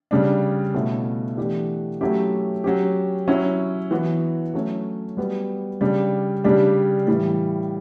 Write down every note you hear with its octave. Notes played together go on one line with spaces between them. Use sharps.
C#3 G3 D4
B2 A3 C#4 E4
E3 A3 D4 G4
F#3 A3 C#4 E4 G4
F#3 C#4 G4
F#3 C#4 E4
E3 B3 F#4
F#3 A3 C#4
G3 B3 F#4
C#3 G3 D4
C#3 G3 D4 G4
A2 E3 G3